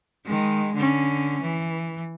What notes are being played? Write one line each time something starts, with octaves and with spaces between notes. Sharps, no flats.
D#3 G#3
D3 C#4
E3